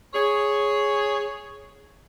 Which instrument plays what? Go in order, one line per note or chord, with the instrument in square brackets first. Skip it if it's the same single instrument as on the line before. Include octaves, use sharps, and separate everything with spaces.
[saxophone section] G#4 C#5